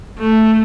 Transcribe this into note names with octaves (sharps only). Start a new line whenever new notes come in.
A3